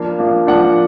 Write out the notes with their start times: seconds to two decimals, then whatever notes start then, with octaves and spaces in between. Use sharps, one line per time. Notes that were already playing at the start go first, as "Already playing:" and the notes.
Already playing: F3 A#3 D4 F5
0.19 F3 A#3 D4
0.47 F3 A#3 D4 F#5